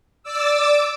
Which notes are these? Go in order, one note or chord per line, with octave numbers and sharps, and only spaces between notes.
D5 D6 E6